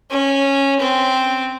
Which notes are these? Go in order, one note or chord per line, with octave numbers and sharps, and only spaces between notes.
C#4
C4